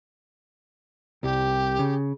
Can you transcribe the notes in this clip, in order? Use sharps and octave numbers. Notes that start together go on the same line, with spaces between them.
C2 G4
C#3